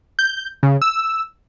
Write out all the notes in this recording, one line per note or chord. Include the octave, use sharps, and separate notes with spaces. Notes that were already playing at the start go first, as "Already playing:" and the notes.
G6
C#3
E6